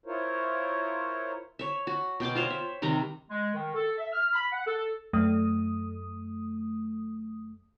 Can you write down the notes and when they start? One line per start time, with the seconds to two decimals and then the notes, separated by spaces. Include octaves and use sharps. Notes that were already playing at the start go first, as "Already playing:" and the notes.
0.06 E4 F4 A#4 C5 C#5
1.59 C#5 E5
1.87 F#4
2.20 B2 G5 C6 D6
2.35 F4 C5 C#5
2.50 E5
2.82 C3 D#3 G3 A#5
3.29 G#3
3.54 D#3
3.74 A4
3.98 E5
4.13 F6
4.33 B5
4.52 F#5
4.66 A4
5.13 F#2 A3 D#6